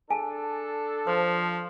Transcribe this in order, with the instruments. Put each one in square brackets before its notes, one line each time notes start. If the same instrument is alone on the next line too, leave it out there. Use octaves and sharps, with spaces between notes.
[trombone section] D4 A4 [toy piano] G#4 G#5 A5
[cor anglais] F3 [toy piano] C5